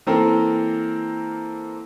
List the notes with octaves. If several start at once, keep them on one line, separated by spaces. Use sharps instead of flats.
E3 A#3 C4 A4 A#4